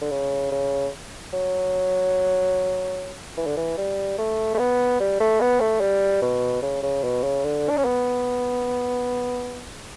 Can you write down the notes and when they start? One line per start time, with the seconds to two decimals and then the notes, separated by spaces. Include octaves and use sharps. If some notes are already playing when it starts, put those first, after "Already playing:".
0.01 D3
0.11 C#3
0.51 C#3
1.33 F#3
3.37 E3
3.47 D3
3.57 E3
3.78 G3
4.18 A3
4.54 A3
4.59 B3
5.00 G3
5.20 A3
5.41 B3
5.60 A3
5.81 G3
6.22 B2
6.62 C#3
6.83 C#3
7.04 B2
7.24 C#3
7.44 D3
7.69 D4
7.77 C#4
7.85 B3